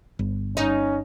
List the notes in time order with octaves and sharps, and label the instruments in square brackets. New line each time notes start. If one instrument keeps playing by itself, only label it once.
[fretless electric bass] G1
[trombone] C#4 [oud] D#4